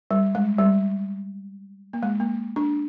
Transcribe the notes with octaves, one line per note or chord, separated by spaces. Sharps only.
G3
G#3
G3
A#3
G#3
A#3
D4